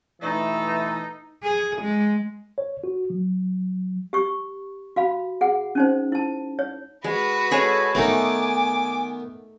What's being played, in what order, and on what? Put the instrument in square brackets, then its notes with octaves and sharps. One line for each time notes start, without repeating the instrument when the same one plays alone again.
[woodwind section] B2 A3 A4 [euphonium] E3 [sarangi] D#4
[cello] G#4
G#3
[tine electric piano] C#5
F#4
F#3
[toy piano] G4 C#6
F#4 F5 B5
G#4 F#5
C#4 D#4 C5
E4 A5
C#5
[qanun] G#3 [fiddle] F#4 B4
[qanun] G#3 G#4 C#5 [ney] A4
[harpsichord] D#3 B3 [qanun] A3 D#4 [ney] G#5 [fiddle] D6